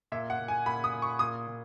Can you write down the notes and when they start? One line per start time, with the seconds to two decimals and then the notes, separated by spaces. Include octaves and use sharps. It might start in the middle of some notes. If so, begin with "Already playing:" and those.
0.12 A#2 E5
0.30 F#5
0.39 A#2
0.48 G#5
0.66 A#2 B5
0.84 D#6
0.93 A#2
1.02 C#6
1.19 A#2 D#6
1.47 A#2